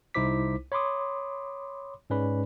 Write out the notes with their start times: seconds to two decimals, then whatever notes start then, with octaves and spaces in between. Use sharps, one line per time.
0.14 C2 D#4 E4 C5 D6 B6
0.72 C#5 B5 C6 D6 D#6
2.10 G#2 G#3 C#4 B4 D5 B5